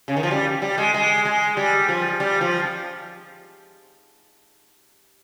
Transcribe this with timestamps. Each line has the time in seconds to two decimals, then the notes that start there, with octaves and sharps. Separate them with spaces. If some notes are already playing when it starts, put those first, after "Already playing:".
0.08 C#3
0.17 D#3
0.23 F3
0.31 G3
0.62 G3
0.78 G#3
0.94 G#3
1.25 G#3
1.57 G3
1.89 F3
2.20 G3
2.41 F3